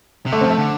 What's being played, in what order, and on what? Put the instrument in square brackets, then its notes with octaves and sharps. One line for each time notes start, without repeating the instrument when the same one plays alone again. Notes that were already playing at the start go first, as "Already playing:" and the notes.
[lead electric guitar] C3
[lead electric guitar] D3 [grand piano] A3
[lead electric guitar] F3 [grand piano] C4
[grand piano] A3
[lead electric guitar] D3